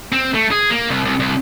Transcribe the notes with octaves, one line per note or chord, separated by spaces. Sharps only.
C4
A3
G#4
A#3
C2
C2
C2